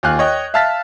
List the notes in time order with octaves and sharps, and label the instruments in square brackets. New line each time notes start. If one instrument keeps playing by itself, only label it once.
[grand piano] D#2 F4 F5 G#5 F#6
C#5 D#5 G5
E5 F5 A5 F6 A6 B6